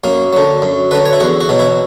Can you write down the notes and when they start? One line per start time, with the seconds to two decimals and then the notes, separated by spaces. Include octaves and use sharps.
0.04 F#2 A#3
0.33 D3 F#3
0.62 F#2
0.91 D3 F#3 B4
1.06 C#5
1.13 E4
1.20 E2 F#4
1.40 F#4
1.49 B2 F#3
1.59 E4